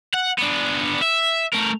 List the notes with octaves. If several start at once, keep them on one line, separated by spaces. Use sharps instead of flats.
F#5
B3 D4
E5
A3 A#4